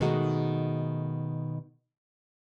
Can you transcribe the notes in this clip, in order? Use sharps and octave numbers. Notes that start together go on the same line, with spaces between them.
B2 D#3 G#3 A3 D#4 F#4